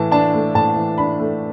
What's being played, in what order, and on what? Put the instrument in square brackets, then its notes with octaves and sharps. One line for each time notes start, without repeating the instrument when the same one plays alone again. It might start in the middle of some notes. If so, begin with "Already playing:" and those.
Already playing: [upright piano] A2 E3 A5
D4 A5
A3
A2 A5
E3
D4 B5
A3